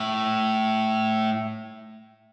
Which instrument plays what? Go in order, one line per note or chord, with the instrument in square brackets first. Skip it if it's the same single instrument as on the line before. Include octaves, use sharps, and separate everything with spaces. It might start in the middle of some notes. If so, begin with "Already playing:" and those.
Already playing: [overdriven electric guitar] A2